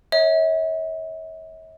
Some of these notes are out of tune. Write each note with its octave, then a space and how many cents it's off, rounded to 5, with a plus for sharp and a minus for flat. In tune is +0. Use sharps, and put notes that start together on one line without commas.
C#5 +0 E5 -40